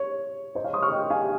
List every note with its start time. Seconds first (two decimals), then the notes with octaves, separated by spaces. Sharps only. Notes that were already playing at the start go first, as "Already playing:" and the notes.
Already playing: C#5
0.55 C5 D#5
0.64 C#5 F5
0.73 C6 D#6
0.82 C#6 F6
0.92 D#5 G5
1.10 F5 G#5